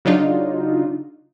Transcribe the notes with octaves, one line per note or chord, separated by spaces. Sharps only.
C#3 F#3 D4 D#4 F4